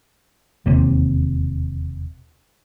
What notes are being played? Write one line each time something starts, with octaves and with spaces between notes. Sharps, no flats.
E1 D#2 C3